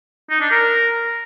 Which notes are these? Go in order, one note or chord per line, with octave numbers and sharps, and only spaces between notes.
D#4
D4
A#4